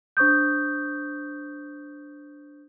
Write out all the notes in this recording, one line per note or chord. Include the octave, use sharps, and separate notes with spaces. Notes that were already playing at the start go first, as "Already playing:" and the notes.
D4 C5 C#6 D#6 G6